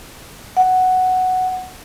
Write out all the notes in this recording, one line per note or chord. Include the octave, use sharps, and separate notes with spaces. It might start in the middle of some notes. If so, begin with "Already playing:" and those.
F#5